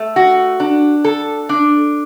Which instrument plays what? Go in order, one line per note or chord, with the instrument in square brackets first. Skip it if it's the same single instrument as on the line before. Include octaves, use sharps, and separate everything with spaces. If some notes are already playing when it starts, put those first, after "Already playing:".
Already playing: [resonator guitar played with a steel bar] A3
F#4
D4
A4
D4